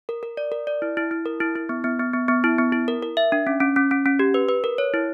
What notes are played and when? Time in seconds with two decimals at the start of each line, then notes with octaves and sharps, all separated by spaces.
0.09 A#4
0.23 A#4
0.37 D5
0.52 A#4
0.67 D5
0.82 E4
0.97 E4
1.11 E4
1.26 A#4
1.40 E4
1.55 E4
1.69 B3
1.84 B3
1.99 B3
2.13 B3
2.28 B3
2.44 E4
2.58 B3
2.72 E4
2.88 A#4
3.03 A#4
3.17 E5
3.32 D4
3.47 C#4
3.60 C#4
3.76 C#4
3.91 C#4
4.06 C#4
4.19 G4
4.34 B4
4.49 B4
4.64 A#4
4.78 C#5
4.94 E4